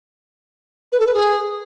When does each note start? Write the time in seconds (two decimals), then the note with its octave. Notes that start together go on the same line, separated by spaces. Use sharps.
0.92 B4
0.99 A4
1.06 B4
1.13 G#4